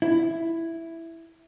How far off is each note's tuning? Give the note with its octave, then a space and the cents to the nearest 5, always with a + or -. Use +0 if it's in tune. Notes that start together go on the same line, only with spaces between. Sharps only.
E4 +0